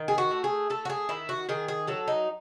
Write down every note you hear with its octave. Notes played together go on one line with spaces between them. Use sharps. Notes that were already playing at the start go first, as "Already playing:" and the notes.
Already playing: D#3
G#4
F#4
A3
G#4
A3 A4
F#4
G#4
D#3 E4
F#4
D#3 G#4
G#4
F#3 A4
D#4